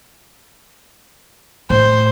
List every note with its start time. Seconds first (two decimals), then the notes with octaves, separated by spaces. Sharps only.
1.70 A2 C5